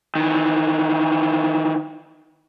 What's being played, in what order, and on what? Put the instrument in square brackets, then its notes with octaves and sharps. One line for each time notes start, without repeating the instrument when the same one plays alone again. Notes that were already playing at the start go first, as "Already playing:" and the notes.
[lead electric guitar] D#3 E3